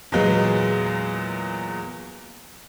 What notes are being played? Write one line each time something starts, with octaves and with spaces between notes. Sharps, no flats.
E2 A#2 F#3 G#3 B3